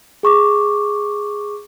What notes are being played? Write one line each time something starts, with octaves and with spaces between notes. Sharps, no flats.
G#4 C#6 D6